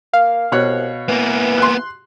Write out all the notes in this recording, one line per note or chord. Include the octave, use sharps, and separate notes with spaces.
A#3 F5
C2 B2 C#5 F#6
E3 A#3 B3
C6 F#6